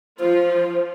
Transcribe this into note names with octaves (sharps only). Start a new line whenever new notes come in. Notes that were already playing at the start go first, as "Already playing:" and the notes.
F3 F4 C5